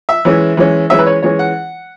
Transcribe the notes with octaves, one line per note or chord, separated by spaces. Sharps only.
E5
E3 G#3 C#4
E3 G#3 C#4
E3 G#3 C#4 E5
B4
C#5
E3 G#3 C#4 C#5
F#5